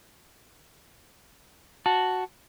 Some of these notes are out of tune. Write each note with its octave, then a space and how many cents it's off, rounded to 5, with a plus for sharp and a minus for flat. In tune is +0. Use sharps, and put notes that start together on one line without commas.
F#4 +0 A5 +0